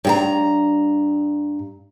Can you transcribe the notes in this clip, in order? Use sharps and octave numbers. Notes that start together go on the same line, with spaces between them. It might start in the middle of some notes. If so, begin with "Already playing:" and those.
G2 G4 A#5